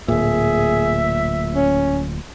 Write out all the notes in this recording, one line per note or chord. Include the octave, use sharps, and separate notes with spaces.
D1 A#2 G#4 E5
C#4